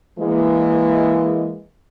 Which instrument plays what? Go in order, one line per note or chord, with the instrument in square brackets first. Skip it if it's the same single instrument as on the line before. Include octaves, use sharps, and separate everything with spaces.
[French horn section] E3 G#3 A#3